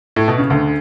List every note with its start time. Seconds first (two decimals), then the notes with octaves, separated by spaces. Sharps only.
0.16 A2
0.28 B2
0.38 C#3
0.50 D2 D3